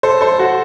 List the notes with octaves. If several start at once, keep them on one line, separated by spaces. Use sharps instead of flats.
A4 C5
A4 C5
F#4 A4